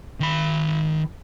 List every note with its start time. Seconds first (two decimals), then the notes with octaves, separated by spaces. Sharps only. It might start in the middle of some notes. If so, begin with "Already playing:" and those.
0.20 D#3 B5